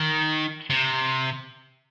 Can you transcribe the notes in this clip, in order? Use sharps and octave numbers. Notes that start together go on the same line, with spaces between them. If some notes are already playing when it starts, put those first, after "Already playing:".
Already playing: D#3
C3